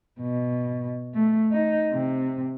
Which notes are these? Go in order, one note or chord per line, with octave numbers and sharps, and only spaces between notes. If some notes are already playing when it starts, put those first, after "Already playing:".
B2
A3
D#4
C3